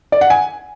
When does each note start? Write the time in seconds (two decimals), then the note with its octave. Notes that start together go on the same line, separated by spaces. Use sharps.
0.12 D5
0.21 F#5
0.30 G#5